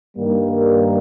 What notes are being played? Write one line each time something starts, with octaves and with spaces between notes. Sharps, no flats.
G2 D#3 G3 A#3